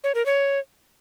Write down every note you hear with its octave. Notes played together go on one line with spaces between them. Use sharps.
C#5
A#4
C#5